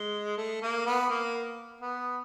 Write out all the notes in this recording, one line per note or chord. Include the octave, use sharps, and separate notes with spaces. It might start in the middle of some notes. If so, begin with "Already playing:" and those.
Already playing: G#3
A3
A#3
B3
A#3
B3